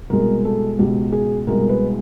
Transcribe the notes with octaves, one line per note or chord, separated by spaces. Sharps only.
C2 B2 G#3 A#4
A4
C#2 B2 G#3 G4
G#4
C2 B2 G#3 A#4
B4